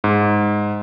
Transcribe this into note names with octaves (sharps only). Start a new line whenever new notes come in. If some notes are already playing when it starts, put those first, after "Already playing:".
G#2